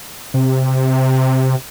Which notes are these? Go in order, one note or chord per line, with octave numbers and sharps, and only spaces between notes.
C3